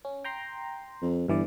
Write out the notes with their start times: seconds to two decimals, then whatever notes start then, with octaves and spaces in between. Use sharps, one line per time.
0.05 C#4
0.24 G5 A#5 C6
1.02 F2
1.28 G1 G2 E3 D5